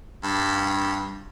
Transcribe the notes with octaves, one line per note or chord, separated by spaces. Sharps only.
G2